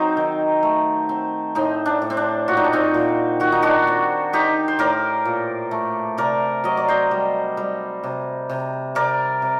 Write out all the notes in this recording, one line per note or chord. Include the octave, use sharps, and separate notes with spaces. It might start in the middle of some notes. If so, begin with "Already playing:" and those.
Already playing: F#3 C4 D#4
D#3
A3
C4
A2 C4 D#4
D4
A2
C4
D4
A#2 F#4
D#4
D4
C4 D#4
A#2
D#3 F#4
D#4
D4 F#4
C4
C4 D#4 G4
C5
A2 A#4 D5
A#2
A3
C3 A#4 D5
F#3 D#5
D5
C5 D#5
G3
G3
C3
C3
C3 A#4 D5
C3